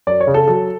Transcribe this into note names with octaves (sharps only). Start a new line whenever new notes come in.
F#2 D5
C#5
C#3
A4
F#3 A4